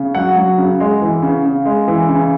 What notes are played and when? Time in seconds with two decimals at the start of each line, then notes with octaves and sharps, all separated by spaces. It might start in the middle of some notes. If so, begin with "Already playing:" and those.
Already playing: C#3
0.15 F#3 F#5
0.36 F#3
0.58 C#3
0.80 G#3
1.02 E3
1.22 C#3
1.45 C#3
1.65 G#3
1.88 E3
2.09 C#3